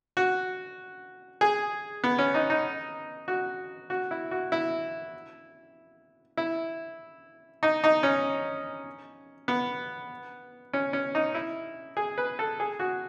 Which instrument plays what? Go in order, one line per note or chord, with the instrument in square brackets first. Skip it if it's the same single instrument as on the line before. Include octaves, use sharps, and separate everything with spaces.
[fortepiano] F#4
G#4
B3
C#4
D#4
D#4
F#4
F#4
E4
F#4
E4
E4
D#4
D#4
C#4
B3
C#4
C#4
D#4
E4
G#4
B4
A4
G#4
F#4